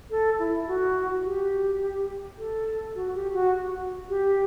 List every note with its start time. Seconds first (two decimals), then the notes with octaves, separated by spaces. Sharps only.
0.10 A4
0.39 E4
0.67 F#4
1.24 G4
2.38 A4
2.95 F#4
3.14 G4
3.33 F#4
4.09 G4